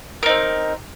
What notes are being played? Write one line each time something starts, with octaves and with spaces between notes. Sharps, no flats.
C4 D#4 A#4